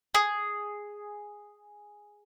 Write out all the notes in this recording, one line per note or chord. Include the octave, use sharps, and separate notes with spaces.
G#4